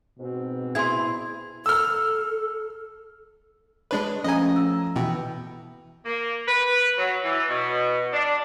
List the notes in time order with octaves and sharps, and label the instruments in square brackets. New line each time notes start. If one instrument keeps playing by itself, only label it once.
[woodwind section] G#2 C4 [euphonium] B2
[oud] E4 G#4 [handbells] C6 G#6
[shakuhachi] A4 [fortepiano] E6 F6
[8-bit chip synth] G#3 D4 B4 [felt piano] C#5
[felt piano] F3 A3 A#5 [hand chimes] C#4 [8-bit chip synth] D#5 G#5
[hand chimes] E6
[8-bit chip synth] B2 [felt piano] E3 [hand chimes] G5
[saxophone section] A#3
B4
F#3
E3
B2
D4